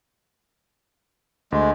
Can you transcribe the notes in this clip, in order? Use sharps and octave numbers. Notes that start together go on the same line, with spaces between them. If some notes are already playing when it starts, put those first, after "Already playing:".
D2 G#3